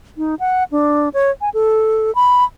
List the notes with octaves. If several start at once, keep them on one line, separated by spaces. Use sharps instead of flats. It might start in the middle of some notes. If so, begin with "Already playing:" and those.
D#4
F#5
D4
C#5
G#5
A4
B5